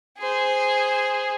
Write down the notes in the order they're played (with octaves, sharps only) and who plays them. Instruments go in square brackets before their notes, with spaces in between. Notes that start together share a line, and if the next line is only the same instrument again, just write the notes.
[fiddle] G#4 C5